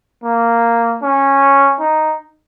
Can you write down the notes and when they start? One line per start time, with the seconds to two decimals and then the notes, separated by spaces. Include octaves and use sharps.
0.24 A#3
1.03 C#4
1.80 D#4